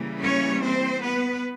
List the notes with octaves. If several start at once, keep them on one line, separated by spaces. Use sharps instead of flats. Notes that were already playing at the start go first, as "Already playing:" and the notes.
Already playing: C#3 E3 G3 A#3
C#4 C#5
C4 C5
B3 B4